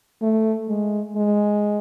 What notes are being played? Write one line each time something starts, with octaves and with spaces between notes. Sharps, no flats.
A3
G#3
G#3